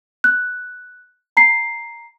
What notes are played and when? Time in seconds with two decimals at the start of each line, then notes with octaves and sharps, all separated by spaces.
0.24 F#6
1.37 A#5 C7